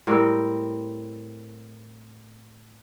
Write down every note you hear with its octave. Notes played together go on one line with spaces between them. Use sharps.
A2 G3 C4 A#4